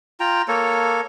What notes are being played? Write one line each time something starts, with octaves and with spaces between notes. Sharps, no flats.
F4 G5 A#5
A#3 A4 C#5